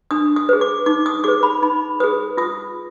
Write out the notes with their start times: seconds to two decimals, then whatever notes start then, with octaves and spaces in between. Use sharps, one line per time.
0.11 D4 D#6
0.36 D#6
0.49 G#4 B4
0.61 D6
0.86 D#4 D6
1.06 D#6
1.24 G#4 B4 D6
1.43 B5
1.62 D#4 B5
2.00 G#4 B4 D#6
2.37 F4 D#6